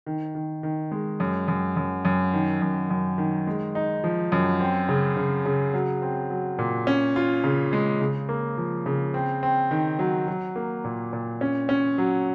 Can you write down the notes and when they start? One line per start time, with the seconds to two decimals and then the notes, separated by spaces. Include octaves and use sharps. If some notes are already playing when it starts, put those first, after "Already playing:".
0.06 D#3
0.35 D#3
0.63 D#3
0.92 G#3
1.20 F#2
1.48 F#2
1.76 F#2
2.05 F#2
2.33 D#3
2.62 F#2
2.90 F#2
3.18 D#3
3.47 G#3
3.75 D#4
4.04 F3
4.32 F#2
4.60 C4
4.89 C#3
5.17 C#3
5.46 C#3
5.74 F#3
6.02 C4
6.30 F#3
6.59 A#2
6.87 C#4
7.16 F4
7.44 C#3
7.73 G#3
8.01 C#3
8.29 A#3
8.58 F3
8.86 C#3
9.14 C4
9.43 C4
9.71 D#3
9.99 F#3
10.28 F#3
10.56 A#3
10.84 A#2
11.13 A#2
11.41 C#4
11.69 C#4
11.98 F#3